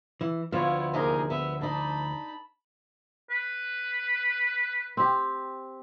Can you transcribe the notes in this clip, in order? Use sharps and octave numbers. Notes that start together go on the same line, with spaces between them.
E3
D2 F3 B3 E4 F4 C#5
D#2 C3 D#4 G#4 A#4
B3 E5
D4 D#4 A5 B5
B4
C4 G4